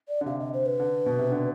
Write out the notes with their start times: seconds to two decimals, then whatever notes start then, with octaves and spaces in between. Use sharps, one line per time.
0.08 D5
0.21 D3
0.26 C3 F5
0.40 D#5
0.54 C5
0.66 B4
0.80 D3
1.06 B2
1.19 C3
1.32 D3